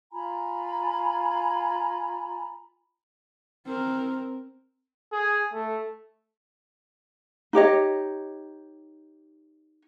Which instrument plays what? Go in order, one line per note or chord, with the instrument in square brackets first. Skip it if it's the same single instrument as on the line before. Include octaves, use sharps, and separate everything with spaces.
[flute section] F4 G#5 A#5 B5
[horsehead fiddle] C4 A#4
[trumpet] G#4
A3
[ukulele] D#4 G4 C#5 D#5